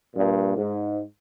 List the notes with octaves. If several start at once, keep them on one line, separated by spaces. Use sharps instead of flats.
G2 A#2
G#2